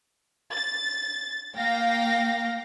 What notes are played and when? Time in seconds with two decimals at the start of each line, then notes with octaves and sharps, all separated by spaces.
0.52 A6
1.56 A#3 F5 G5 A#6